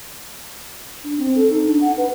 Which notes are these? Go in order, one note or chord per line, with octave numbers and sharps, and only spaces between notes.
D4
C4
A4
D#4
D4
F#5
B4